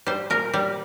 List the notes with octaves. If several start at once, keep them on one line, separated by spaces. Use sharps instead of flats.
G3 C5
A#2 A#4
G3